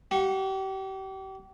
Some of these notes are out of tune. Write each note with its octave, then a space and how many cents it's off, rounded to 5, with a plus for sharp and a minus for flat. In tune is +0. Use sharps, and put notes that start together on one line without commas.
G4 -35 F#5 -35 C#6 +0